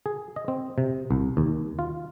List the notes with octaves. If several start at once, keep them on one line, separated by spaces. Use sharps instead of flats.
G#4
D#5
C4
C3
C2
D#2
F4